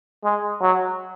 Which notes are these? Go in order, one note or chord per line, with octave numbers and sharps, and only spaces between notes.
G#3
F#3